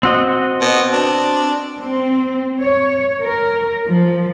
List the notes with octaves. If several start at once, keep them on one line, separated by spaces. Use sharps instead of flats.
C4 F#4 D#5
B2
D4
C4
C#5
A#4
F3